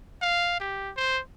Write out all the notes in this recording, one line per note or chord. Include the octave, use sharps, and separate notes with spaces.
F5
G4
C5